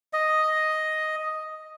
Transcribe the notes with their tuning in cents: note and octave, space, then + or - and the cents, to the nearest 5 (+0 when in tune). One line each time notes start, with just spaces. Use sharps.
D#5 +5